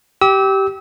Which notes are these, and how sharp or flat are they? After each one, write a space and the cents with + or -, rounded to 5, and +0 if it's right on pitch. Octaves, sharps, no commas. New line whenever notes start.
G4 -15 E6 -35